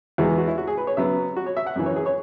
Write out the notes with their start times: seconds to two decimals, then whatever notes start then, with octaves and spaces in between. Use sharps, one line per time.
0.18 E2 E3 G#3 B3 F#4
0.38 F#4
0.48 E4
0.58 F#4
0.67 G#4
0.78 B4
0.87 C#5
0.97 C#3 F#3 B3 E5
1.37 F#4
1.46 C#5
1.57 E5
1.67 F#5
1.76 F#2 C#3 E3
1.86 C#5
1.96 G#4
2.06 C#5